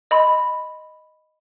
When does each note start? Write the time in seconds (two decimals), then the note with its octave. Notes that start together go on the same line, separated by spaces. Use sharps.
0.11 D#5 B5 C6